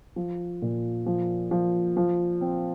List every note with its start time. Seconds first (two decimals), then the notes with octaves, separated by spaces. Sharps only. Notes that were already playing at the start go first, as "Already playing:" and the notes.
0.16 F3
0.62 A#2
1.06 F3
1.51 F3
1.97 F3
2.41 C4